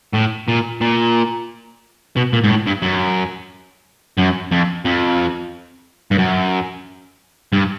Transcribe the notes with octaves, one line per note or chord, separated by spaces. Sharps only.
A2
A#2
A#2
B2
A#2
G#2
A2
G2
F#2
F#2
F2
F2
G2
F#2
G2